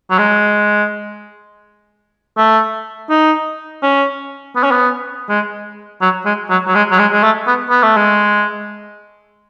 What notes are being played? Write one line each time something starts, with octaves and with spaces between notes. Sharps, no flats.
F#3
G#3
A3
D#4
C#4
B3
C#4
B3
G#3
F#3
G#3
F#3
F#3
G#3
F#3
G#3
G#3
A3
B3
B3
A3
G#3